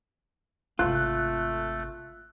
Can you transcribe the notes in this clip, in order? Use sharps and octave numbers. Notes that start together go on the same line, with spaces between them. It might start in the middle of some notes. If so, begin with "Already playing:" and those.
G#1 C3 A3 F4 A4 F#6